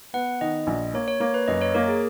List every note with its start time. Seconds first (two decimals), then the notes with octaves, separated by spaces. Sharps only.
0.14 B3 F#5
0.41 D#3 D#5
0.67 A#1
0.94 A#3 C#5
1.08 C#5
1.20 A#3 C#5
1.34 B4
1.48 F#2 D#5
1.61 C#5
1.74 A#3 A#4
1.88 G#4